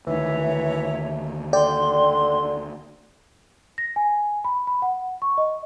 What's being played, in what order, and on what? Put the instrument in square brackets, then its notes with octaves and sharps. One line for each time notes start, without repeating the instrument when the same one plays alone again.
[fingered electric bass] D2 D#3 [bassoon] E3 [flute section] C#5 E5
[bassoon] D3 [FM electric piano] D5 G5 [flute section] C6
[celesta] A#6
G#5
B5
B5
F#5
C#6
D#5